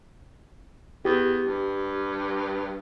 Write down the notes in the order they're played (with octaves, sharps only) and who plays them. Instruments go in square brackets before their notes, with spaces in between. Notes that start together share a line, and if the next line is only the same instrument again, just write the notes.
[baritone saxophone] E2 [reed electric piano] G4
[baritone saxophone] G2